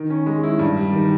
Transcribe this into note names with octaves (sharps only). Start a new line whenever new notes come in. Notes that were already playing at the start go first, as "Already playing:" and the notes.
Already playing: D#3
C#4
G#3
E4
G2
G3
D#3